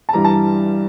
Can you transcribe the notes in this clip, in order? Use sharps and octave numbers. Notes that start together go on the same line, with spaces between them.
A5
G2 E3 G3 A#5
A5